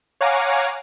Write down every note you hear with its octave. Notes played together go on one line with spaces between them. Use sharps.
C#5 F5 F#5 G#5 A#5 D6